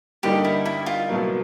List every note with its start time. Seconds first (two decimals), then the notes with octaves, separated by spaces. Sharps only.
0.23 G2 D3 G3 A#3 D#4 G4
0.45 E4
0.66 E4
0.86 F4
1.08 C2 B2 F#3 A#3